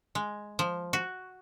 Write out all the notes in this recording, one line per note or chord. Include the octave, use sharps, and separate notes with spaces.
G#3
F3
F#4